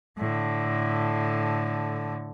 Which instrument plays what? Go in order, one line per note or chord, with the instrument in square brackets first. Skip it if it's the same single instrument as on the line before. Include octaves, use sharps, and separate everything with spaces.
[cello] A2 D3